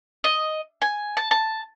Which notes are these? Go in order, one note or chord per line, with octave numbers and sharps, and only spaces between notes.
D#5
G#5
A5
A5